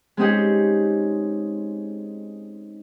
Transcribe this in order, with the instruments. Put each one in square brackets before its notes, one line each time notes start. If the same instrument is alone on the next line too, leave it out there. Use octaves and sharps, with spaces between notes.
[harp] G#3 C4 C#4 D#4 G4 G#4